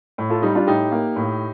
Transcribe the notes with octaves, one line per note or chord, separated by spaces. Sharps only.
A2
F4 A4
G3 D#4
D4 F4
A2 D#4 G4
A#3
A2